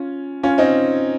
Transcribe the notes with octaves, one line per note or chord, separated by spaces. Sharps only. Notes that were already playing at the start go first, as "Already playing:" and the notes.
Already playing: C#4 F4
C#4 F4
C4 D#4